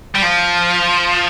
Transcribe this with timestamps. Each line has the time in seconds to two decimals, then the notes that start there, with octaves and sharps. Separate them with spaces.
0.15 G3
0.22 F3